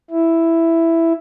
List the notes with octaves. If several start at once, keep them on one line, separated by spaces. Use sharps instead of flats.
E4